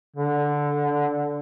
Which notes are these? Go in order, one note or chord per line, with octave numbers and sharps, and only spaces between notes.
D3